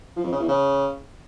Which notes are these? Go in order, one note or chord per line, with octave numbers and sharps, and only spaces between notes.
F3
F2
C#3
E2
C#3